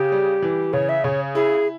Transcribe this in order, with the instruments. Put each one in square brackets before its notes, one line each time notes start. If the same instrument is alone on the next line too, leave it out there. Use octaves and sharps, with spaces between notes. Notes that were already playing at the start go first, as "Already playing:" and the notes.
Already playing: [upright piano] C#3 [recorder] G4
[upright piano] G3
E3
[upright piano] C#3 [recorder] C#5
[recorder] E5
[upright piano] C#3 [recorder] C#5
[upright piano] E4 [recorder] G#4